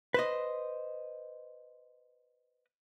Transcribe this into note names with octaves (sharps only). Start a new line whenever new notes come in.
B4 C5 D#5